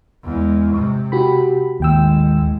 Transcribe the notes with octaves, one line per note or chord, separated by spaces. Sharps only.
E2 G#3
C3
F#4 G4 B5
A1 D#2 G#3 G5 E6